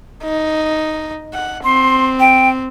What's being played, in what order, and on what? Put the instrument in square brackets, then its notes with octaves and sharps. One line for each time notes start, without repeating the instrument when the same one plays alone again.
[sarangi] D#4
F#5
[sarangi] C4 [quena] C6
[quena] G5